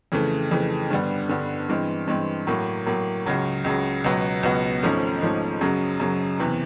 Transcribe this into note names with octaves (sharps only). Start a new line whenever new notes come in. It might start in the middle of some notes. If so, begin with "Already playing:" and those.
F2 C#3 E3 A3
F2 C#3 E3 A3
G2 D3 G3 B3
G2 D3 G3 B3
G2 E3 G#3 C4
G2 E3 G#3 C4
A2 F#3 A#3
A2 F#3 A#3
C#2 C#3 F#3
C#2 C#3 F#3
C#2 B2 F#3 B3
C#2 B2 F#3 B3
G#1 G#2 F3 A3 C#4
G#1 G#2 F3 A3 C#4
F#2 C#3 F#3
F#2 C#3 F#3
E2 C3 E3